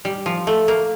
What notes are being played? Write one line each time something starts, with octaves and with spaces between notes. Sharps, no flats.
G3
F3
A3
A#3